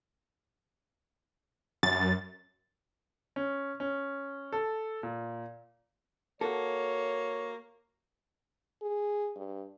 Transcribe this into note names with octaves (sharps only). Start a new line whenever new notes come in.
F#2 A6
C#4
C#4
A4
A#2
A#3 F#4 A4 C#5
G#4
G2